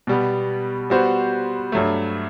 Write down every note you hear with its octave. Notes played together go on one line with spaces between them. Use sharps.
B2 G3 B3
G3 B3 F#4 C5
G2 F#3 A3